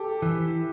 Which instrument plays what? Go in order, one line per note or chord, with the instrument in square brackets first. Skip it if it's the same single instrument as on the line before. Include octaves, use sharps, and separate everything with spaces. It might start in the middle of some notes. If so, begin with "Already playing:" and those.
Already playing: [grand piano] G4 A4
[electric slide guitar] E3